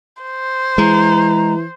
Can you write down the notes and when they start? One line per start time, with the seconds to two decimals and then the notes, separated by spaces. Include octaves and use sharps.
0.23 C5
0.78 E3 G#3 A#5